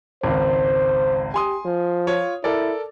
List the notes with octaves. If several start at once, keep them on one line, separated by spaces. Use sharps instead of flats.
G#1 C#2 C5
G4 G#5 C6 D#6
F3
F4 C#5
E4 A4 A#4 D5